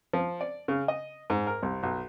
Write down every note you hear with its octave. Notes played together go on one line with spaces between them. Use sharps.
F3
D5
C#3
D#5
G#2
A#4
C2
B1